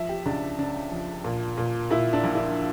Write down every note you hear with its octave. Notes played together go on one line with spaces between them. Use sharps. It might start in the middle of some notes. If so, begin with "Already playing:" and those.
Already playing: F3 E5
G4
C#2 D4
C#3 D4
F3
A#2
A#2
A#2 E4
D4
A#1
E4